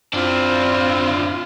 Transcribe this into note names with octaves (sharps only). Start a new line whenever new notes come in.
F#2 C4 D4 E4 F4